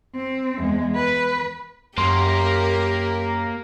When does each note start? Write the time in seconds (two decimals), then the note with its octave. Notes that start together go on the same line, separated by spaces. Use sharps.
0.15 C4
0.58 E2 G#3
0.96 B4
1.98 F#2 A#3 G4 A#4 C6